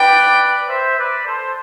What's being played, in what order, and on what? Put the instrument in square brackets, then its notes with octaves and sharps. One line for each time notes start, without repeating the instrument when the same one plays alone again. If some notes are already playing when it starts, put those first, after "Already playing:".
Already playing: [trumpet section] B4 D5 [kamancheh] G5
[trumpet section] C5 E5
B4 D5
A4 C5